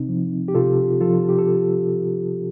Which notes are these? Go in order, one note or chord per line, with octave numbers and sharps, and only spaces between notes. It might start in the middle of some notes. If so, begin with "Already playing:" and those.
Already playing: C3 C4 D#4
F3
G4
C3 F4 A4
F3 F4 A4
G4
A4